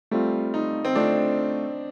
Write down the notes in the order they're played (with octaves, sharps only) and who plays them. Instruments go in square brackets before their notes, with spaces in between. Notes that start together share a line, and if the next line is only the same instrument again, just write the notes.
[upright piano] G3 [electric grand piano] A3 C4 F4
[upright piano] D#4
C4
[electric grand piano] A3 C4 F4 [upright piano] D4